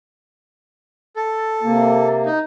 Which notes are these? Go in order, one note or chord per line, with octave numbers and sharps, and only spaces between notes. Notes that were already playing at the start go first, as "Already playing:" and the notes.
A4
C3 A#3
D#4